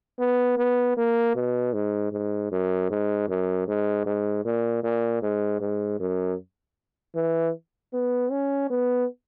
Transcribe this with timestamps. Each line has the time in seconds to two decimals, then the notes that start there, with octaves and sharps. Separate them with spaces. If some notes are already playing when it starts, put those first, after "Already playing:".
0.19 B3
0.57 B3
0.97 A#3
1.35 B2
1.73 G#2
2.12 G#2
2.52 F#2
2.90 G#2
3.29 F#2
3.68 G#2
4.06 G#2
4.45 A#2
4.83 A#2
5.22 G#2
5.60 G#2
5.99 F#2
7.15 E3
7.93 B3
8.31 C#4
8.70 B3